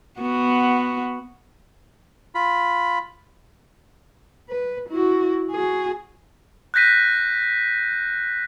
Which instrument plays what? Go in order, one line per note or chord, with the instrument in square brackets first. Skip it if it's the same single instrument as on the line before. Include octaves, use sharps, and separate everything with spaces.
[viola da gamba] B3 F#4
[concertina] F4 B5
[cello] B4
E4 F#4
F#4 G#4
[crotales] F#6 G6 A#6 B6 D#7